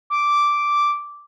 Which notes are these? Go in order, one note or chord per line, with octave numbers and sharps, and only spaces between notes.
D6